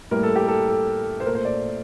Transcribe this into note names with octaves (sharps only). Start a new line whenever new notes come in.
A2 G3 A#3 A#4
A4
G4
A4
A4
C5
A#2 A3 A#4
C5
D5